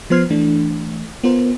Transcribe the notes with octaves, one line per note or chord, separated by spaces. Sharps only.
F3 B3 C5 F6 G#6 C7
E3 A3 D4
B3 F4 A#4 C5